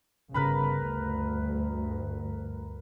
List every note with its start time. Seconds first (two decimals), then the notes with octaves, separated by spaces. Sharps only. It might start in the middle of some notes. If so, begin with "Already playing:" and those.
0.34 G1 C#3 A#4 B4 B5
0.77 D2 G2